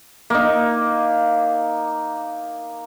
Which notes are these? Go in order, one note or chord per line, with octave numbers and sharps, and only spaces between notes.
A#3 D#4